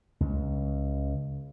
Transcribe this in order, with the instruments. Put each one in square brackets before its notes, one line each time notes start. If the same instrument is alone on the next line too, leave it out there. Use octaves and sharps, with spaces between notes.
[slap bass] C#2